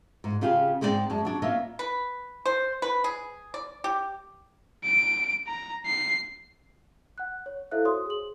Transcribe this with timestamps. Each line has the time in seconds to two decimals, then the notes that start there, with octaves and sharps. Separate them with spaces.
0.24 G#2
0.41 C#3 C#4 F4 G4 G#4
0.81 G#2 G#3 C4 F#4 D5 G5
1.10 F#2 G#3 A5
1.25 F#3 D4
1.42 A#3 B3 F4 C#5 D#5 E5
1.79 B4
2.45 C5
2.82 B4
3.04 G#4
3.54 D5
3.84 G4
4.85 D7
5.48 A#5
5.86 C7
7.18 F#5 F#6
7.46 C#5
7.71 E4 A4 C5 E5 F5 F#6
7.85 F#4 C5 C#5 C6 D#6
8.06 G#4 F#7